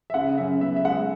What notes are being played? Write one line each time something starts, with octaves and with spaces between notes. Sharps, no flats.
E5
C#3 F#5
F#2 E5
B3 E5
E5
G#3 F#5